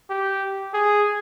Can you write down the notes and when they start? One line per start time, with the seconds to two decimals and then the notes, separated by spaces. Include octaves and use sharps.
0.10 G4
0.74 G#4